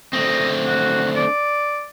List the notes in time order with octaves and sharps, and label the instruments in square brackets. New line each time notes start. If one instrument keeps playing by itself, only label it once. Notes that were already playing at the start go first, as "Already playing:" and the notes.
[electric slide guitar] D3 A3 C4 [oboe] D#5
[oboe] F#4
D5